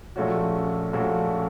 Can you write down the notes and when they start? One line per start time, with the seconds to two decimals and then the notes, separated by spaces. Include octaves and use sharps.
0.16 A#1 A#2 A3 C#4 F#4
0.93 A#1 A#2 A3 C#4 F#4